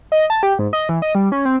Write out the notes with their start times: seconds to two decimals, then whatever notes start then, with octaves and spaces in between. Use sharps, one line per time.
0.12 D#5
0.30 A5
0.43 G4
0.59 G#2
0.73 D#5
0.89 E3
1.02 D#5
1.15 G3
1.32 C#4
1.45 C4